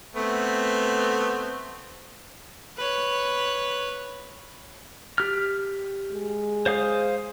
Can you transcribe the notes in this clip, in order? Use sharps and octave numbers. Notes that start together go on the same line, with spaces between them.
A3 B3 C4
B4 C#5
G4 F6
G#3
C5 F5 D#6